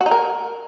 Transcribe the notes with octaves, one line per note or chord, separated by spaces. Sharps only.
F#4
D#4
A#4